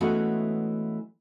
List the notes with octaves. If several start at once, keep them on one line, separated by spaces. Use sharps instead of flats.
E3 G#3 A3 B3 C#4 F#4